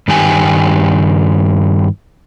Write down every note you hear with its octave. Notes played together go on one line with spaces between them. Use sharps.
G2 D#3 G4 G#5